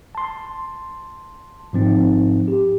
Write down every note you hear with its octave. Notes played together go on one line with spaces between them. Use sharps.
A5 C6
G#2 F3 C4 D#4
G4